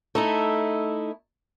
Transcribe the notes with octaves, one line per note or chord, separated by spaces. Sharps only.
A3 D#4 E4